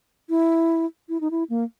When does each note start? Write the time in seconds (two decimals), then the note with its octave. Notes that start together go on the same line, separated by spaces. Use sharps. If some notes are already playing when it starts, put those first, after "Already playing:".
0.29 E4
1.09 E4
1.21 D#4
1.31 E4
1.50 A#3